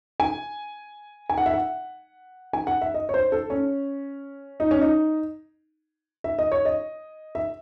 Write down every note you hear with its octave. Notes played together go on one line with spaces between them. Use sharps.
G#5
G#5
F#5
E5
F#5
G#5
F#5
E5
D#5
C#5
C5
A4
C#4
D#4
C#4
D#4
E5
D#5
C#5
D#5
E5